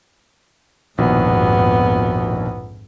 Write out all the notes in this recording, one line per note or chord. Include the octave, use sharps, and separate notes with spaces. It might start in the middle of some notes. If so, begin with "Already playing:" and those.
A#1 F2 G#2 B2 D#3 B3